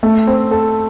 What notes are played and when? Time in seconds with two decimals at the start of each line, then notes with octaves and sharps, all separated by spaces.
0.03 A3
0.27 C4
0.51 A4